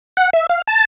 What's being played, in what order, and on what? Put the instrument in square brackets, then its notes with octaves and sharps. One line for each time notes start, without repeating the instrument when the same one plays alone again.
[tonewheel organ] F#5
E5
F5
A5